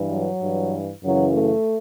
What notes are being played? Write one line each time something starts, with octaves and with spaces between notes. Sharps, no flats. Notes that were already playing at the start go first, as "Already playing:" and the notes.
Already playing: G2 E3
F#3
G2 E3
F#2 C#3 E3 F#3
A3